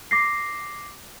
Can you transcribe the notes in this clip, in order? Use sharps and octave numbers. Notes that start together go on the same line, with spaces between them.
D6 A#6 C7